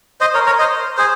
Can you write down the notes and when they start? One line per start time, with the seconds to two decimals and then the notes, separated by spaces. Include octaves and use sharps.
0.21 C5 D#5
0.34 A#4 C#5
0.46 A#4 C#5
0.59 C5 D#5
0.97 G#4 C5